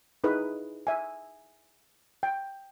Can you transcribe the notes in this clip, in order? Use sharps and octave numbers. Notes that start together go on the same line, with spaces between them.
D#4 E4 G#4 B4
E5 G#5
G5